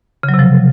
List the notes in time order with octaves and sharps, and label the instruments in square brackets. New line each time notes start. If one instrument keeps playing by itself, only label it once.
[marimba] C#3
F#3
C3
F3